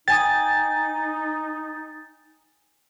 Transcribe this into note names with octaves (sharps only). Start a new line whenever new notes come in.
D#4 G5 G#5 D#6 A6